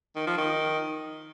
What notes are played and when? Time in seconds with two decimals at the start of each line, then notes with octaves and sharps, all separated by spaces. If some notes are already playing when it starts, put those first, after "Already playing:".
0.16 D#3
0.27 F3
0.38 D#3